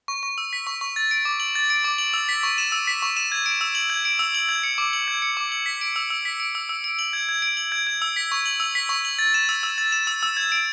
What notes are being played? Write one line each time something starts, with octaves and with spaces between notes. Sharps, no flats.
C#6
C#6
E6
B6
C#6
C#6
A6
D7
D6
F#7
A6
D7
D6
F#7
E6
B6
C#6
E7
E6
B6
C#6
E7
G#6
D7
E6
F#7
G#6
D7
E6
F#7
G#6
C#7
D6
F#7
G#6
C#7
D6
F#7
B6
D7
E6
E6
B6
D7
E6
E6
D7
F#7
G#6
G#6
D7
F#7
G#6
G#6
E6
B6
C#6
F#7
E6
B6
C#6
F#7
A6
E7
E6
E6
A6
E7
E6
E6
G#6
D7